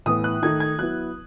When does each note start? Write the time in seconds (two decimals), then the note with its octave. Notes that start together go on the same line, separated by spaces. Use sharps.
0.06 A2 E3 B3 D#6
0.24 F#6
0.42 D#3 A3 D#4 G#6
0.60 G#6
0.78 F#3 B3 E4 F#6